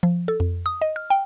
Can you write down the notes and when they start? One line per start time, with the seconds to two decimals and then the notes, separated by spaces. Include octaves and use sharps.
0.03 F3
0.28 A4
0.40 F2
0.66 D#6
0.82 D#5
0.96 F6
1.10 G5